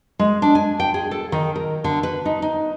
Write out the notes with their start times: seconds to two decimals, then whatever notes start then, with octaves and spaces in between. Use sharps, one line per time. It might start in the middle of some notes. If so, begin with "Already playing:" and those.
0.19 G#3
0.42 D4
0.55 G#5
0.80 G5
0.94 G#4
1.11 A4
1.32 D#3
1.56 A#4
1.84 D3
2.03 B4
2.25 D#4
2.42 D#4